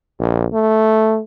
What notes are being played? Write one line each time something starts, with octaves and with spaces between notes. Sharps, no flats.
A#1
A3